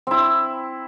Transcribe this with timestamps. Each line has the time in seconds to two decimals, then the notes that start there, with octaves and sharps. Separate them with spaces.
0.07 C4 E4